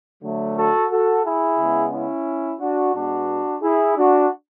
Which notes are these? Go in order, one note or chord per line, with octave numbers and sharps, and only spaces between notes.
D3 F#3 A3
F#4 A4
F#4 A4
E4 G#4
C#3 G#3 B3
C#4 E4
D4 F#4
B2 G#3 B3 D4 F#4
E4 G#4
D4 F#4